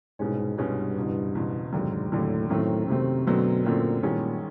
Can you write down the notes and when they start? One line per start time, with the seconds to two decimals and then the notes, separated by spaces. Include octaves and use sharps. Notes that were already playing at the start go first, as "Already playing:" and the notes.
0.19 C2 G#2 B2 G#3 C#4
0.58 C2 G2 B2 G#3 C#4
0.97 F#1 E2 B2
1.35 F#1 E2 B2
1.73 F1 D#2 G#2 D3 F#3
2.12 F1 D#2 A2 D3 F#3
2.50 F#2 A2 D#3 F#3 A3 C4
2.88 F#2 C3 D#3 F#3 A3 C4
3.26 F#2 B2 D3 F#3 A3 C4
3.64 F#2 A#2 D3 F#3 A3 C4
4.03 A1 G2 A#2 D#3 G#3 C#4